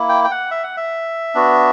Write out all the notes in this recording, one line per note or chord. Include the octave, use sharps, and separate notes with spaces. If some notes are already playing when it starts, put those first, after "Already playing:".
Already playing: A#3 E4
G5
G5
F#5
E5
F#5
E5
B3 D4 F#4